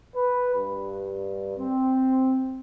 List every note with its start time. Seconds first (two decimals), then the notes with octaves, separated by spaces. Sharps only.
0.15 B4
0.56 G2
1.57 C4